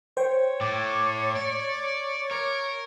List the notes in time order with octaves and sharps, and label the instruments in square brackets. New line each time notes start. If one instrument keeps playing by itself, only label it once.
[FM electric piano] C5 G5 [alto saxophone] C#5
[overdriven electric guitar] A2 [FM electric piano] D6 A6
[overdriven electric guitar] D5
[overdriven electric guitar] A#4 [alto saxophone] C#5